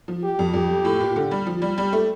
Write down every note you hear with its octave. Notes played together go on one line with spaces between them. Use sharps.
F3
G4
F2
F2 G4
A2
A#2
D3
G3
F3
G3
G3 G4
A3